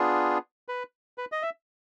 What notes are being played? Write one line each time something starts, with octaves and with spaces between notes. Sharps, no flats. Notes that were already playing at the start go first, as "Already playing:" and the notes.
Already playing: B3 D4 F4 G#4
B4
B4
D#5
E5